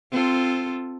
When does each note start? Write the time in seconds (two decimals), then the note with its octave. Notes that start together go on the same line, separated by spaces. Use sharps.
0.11 C4 F4 A4